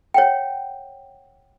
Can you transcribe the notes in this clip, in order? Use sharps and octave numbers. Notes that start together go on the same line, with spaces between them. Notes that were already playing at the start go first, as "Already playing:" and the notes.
C#5 F#5 G5